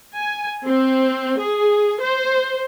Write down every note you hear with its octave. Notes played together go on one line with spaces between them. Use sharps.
G#5
C4
G#4
C5